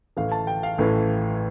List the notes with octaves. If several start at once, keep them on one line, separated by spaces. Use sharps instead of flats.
A1 A2 E3 F5
A5
G5
F5
A1 A2 E3